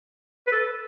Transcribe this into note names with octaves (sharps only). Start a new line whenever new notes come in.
B4
A4